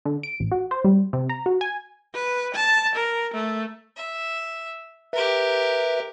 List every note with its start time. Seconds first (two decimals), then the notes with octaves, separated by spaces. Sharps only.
0.05 D3
0.23 D7
0.40 A1
0.52 F#4
0.71 C5
0.84 G3
1.13 C3
1.29 A#5
1.46 F#4
1.61 G#5
2.13 B4
2.54 A5
2.95 A#4
3.34 A3
3.96 E5
5.13 G4 A#4 B4 E5